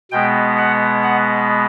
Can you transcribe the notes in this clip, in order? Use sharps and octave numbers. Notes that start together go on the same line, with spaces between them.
B2 G#3 B3 G5
F#5
F#5